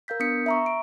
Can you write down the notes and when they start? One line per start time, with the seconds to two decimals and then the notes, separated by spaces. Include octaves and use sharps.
0.08 A#4 F5 G6 B6
0.20 B3 D4 D#6 B6 C#7
0.46 E5 A#5 C#6
0.66 D7